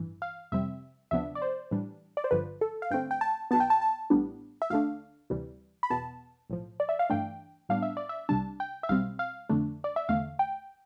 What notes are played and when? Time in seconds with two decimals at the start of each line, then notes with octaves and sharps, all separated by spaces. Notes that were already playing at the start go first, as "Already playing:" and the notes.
Already playing: A1 G2 E3
0.22 F5
0.52 F2 C3 G3 C4 E5
1.11 D2 C3 F3 B3 D4 E5
1.35 D5
1.42 C5
1.71 A2 E3 G3 D4
2.17 D5
2.24 C5
2.31 G1 G2 D3 F3 B4
2.61 A4
2.82 F5
2.91 G2 D3 A3 C4 G5
3.11 G5
3.21 A5
3.51 B1 B2 B3 A5
3.60 G5
3.70 A5
3.81 A5
4.10 A1 A2 G3 B3 D4
4.62 E5
4.70 D2 D3 A3 D4 F5
5.30 D2 C3 E3 G3
5.83 B5
5.90 E2 B2 B3 A5
6.50 B1 A2 F3
6.80 D5
6.89 E5
6.99 F5
7.10 G2 E3 A3 D4 G5
7.69 A2 G3 B3 D4 F5
7.82 E5
7.97 D5
8.09 E5
8.29 C2 C3 G3 D4 A5
8.60 G5
8.83 E5
8.89 B1 B2 G3 C4 F5
9.19 F5
9.49 F2 D3 A3 D4
9.84 D5
9.96 E5
10.09 E2 D3 A3 F5
10.39 G5